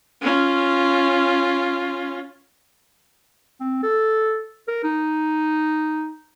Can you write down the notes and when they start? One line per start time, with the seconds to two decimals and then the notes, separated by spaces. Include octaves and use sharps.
0.22 C#4 F4
3.60 C4
3.83 A4
4.68 A#4
4.84 D#4